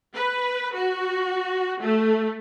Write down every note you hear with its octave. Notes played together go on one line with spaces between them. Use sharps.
B4
F#4
A3